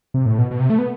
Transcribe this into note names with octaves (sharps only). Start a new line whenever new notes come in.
C3
A2
B2
B2
C3
A3
B3